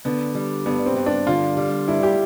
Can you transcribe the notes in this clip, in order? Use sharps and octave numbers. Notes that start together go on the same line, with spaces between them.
D3 B3
G3
G2 B3
C4
G2
D4
D3 F4
G3
G2 E4
G4